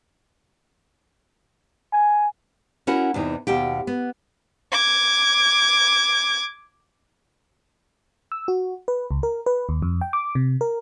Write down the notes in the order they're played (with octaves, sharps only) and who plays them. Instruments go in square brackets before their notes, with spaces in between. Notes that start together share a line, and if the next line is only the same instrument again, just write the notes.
[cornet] G#5
[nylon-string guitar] C#4 E4 F#4 A#4 F#5
E2 C3 E3 D#4
D#2 B2 G4 G5
B3
[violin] D6 G#6
[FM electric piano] E6
F#4
B4
C#2
A#4
B4
D#2
F2
G5
D6
C3
A#4